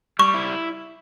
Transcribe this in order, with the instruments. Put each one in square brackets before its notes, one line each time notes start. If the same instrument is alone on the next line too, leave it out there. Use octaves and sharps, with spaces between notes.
[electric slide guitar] G3 [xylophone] C#6
[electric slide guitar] E4